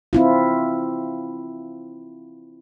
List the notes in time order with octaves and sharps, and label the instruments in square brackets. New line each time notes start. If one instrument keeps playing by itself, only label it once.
[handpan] C4 E4 F4